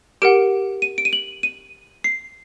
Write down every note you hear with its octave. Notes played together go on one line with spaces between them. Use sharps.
G4 A#4 F#5 D7
D#7
D7
D#7
F#7
D#7
C7